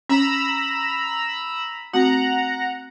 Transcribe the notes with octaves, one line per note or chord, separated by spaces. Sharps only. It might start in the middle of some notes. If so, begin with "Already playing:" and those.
C#4 A#5 B5 E6
A3 C4 F#4 F#5 A#5